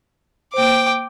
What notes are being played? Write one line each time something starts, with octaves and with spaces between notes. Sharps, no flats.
A#3 C5 G5 D6